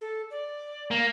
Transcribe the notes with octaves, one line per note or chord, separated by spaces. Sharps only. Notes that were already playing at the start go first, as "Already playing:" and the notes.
A4
D5
A#3